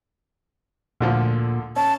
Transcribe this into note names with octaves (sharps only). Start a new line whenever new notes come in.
D2 A#2 D3 F3
C#4 A5